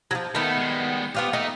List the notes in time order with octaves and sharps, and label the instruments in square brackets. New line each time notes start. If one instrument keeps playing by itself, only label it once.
[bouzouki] F3 F#3
[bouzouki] D#3 B3 [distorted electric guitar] A3 A4
[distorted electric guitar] G3 G#3
[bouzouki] B3 F4 G4
[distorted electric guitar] A3 [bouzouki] D#4